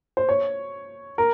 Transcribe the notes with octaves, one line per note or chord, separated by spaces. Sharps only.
C5
C#5
A#4